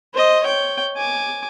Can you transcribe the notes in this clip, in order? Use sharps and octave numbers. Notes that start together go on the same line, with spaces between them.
C5 D#5
C#5 G5
G#5 D6